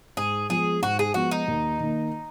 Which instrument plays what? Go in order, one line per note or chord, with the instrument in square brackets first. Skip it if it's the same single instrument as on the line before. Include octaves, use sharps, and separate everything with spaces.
[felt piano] G#2 [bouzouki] G#4
[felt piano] F3 G#3 B3 [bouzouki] G#4
[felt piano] G#2 [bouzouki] F#4
[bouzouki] G#4
[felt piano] F3 G#3 B3 [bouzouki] F#4
[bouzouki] D#4
[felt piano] D#2
D#3 A#3